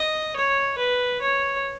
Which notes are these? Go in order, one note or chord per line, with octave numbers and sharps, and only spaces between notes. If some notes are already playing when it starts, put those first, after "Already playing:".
Already playing: D#5
C#5
B4
C#5